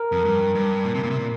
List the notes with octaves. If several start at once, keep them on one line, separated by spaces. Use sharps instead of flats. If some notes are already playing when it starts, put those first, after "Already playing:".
Already playing: A#4
F2
G2
G2
A#2
C3
A#2
C3
A#2